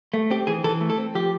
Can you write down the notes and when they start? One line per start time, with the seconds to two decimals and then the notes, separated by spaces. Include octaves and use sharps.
0.14 A3
0.30 C4 G4
0.47 E3 G#4
0.64 E3 A4
0.81 A3
0.90 A4
0.98 C4
1.15 F3 G4